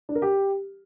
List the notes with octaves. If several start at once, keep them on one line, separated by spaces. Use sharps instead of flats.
D4
A#4
G4